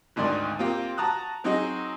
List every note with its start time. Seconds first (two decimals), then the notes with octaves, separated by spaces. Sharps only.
0.16 G#1 D2 G#2 D#3 D5 C6
0.59 A#3 C4 F4 G4 G5
0.97 F#4 A5 A#5 D#6 F#6
1.44 F#3 C4 D#4 F#4 G#4 D#5